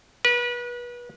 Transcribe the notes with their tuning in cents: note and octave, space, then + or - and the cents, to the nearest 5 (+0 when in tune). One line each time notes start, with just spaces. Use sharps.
B4 -30